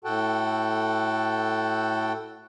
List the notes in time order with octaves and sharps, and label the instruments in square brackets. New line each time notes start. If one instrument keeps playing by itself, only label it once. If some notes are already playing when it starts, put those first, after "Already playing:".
[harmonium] A2 F#4 A4 F#5 G5 A5